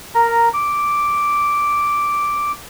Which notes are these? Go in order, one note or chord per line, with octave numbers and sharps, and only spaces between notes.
A#4 A#5
D6